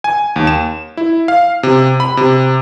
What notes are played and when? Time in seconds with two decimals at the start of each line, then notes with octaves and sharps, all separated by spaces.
0.04 G#5
0.36 D#2
0.47 E7
0.97 E4
1.28 F5
1.63 C3
2.00 B5
2.17 C3